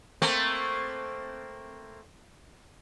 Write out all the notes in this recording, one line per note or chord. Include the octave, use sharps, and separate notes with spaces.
A3 A#3 C4